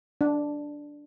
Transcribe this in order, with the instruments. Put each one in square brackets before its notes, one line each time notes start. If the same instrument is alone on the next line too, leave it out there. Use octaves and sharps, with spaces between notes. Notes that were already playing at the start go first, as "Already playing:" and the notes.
[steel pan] D4